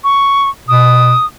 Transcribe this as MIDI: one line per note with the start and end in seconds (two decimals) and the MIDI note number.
0.04 0.49 85
0.68 1.14 47
0.68 1.26 87